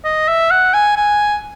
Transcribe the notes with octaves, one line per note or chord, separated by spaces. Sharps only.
D#5
E5
F#5
G#5
G#5